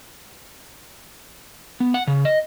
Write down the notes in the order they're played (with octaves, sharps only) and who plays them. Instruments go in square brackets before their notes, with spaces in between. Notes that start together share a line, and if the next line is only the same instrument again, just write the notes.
[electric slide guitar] B3
F#5
C#3
D#5